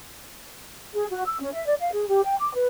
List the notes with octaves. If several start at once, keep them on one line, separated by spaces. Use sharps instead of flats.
G#4
F#4
E6
C#4
E5
D5
F5
G#4
G4
G5
D6
B4